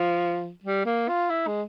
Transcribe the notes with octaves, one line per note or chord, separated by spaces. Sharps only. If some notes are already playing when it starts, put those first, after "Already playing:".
Already playing: F3
G3
A#3
F4
E4
G#3